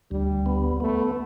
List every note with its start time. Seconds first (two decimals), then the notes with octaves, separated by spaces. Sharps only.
0.11 D2 G3
0.46 B3
0.80 A3 B3